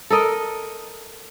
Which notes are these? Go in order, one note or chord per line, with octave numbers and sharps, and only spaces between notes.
A4 A#4 D#5